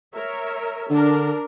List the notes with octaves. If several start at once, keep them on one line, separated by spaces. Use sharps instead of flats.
A#4 C#5 E5
D3 D4 A#4